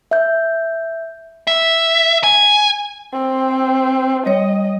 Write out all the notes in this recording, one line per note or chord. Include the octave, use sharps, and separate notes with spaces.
E5 G6
E5
G#5
C4
G3 C#5 D#5